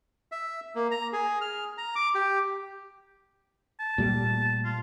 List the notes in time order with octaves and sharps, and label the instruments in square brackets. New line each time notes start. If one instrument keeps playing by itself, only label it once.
[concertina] E5
A#3
A#5
G#4
F6
A#5
D6
G4
[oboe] A5
[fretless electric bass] A#2 G3 A3
[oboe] F4